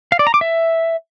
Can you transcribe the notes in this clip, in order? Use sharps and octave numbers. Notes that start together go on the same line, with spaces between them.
F5
D5
A#5
D6
E5